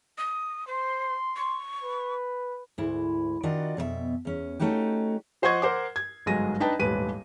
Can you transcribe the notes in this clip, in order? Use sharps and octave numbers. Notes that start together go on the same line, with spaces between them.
D#6
C5 C6
C#6
B4
D2 G#2 E4
D#3 D4 F4 F#4 D5 D#5
F2 B2 A#4 E5
E2 C#4
A3 C#4 D#4 F#4 G4
F3 C5 D#5 F#5 C#6 G#6
A#4 C5 F#5 D6
G#6
G1 G#2 F#3 G#3 A#6 D#7
D4 D#4 B4 G5 A5
D#1 A1 G#2 B4 D#7